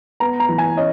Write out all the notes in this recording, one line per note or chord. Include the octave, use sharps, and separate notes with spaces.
B3 A#5
A#5
E3
G#5
C#4 D#5